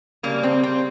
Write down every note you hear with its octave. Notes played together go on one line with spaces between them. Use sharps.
C#3 G3 A#3
C4
C4